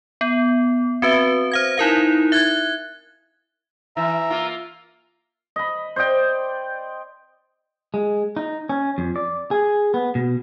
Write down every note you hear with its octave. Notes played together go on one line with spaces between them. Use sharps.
B3
C4 F#4 B4 E5
C5 F5 G#6
D#4 E4 A#4 F5
E5 F#6 G#6
E3 E5 A#5
A#3 F4
D#5 B5
C5 D5 D#5 G5
G#3
D#4
C#4
F2
D5
G#4
B3
B2